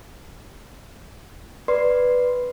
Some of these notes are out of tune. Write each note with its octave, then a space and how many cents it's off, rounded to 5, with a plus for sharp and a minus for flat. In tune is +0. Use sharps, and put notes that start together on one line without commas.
B4 +0 D5 +0 C6 +0